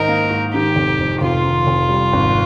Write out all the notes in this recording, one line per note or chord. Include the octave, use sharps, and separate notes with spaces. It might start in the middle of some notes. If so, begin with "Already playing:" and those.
Already playing: G#2 D#3 D#4 A#4
A#3
G#2
D#3 G4
F1
F2
F1 F4
D#3
F1
G3
G#1